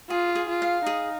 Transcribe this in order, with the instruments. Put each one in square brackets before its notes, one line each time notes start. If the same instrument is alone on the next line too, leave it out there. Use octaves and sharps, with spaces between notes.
[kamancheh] F4 [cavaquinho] G#4
[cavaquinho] G#4
[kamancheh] F4
[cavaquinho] F5
[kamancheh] D#4 [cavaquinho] G#4